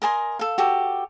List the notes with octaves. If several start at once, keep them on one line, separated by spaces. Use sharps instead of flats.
A#4 D#5 G#5 C6
A4 F5
F#4 G4 A4